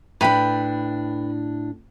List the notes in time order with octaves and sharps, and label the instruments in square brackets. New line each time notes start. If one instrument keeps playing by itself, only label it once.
[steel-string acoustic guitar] A2 D4 [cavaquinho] B4 G5 B5